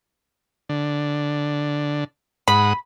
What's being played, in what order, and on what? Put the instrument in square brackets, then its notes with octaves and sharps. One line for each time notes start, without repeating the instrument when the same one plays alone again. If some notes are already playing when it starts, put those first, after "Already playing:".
[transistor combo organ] D3
[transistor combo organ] G#2 F#5 D#6 [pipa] B5